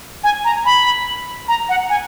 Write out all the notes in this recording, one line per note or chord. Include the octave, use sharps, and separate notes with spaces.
G#5
A#5
B5
A#5
F#5
G#5